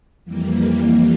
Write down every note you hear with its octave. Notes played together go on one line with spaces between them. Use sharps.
F2 E3 G3 A#3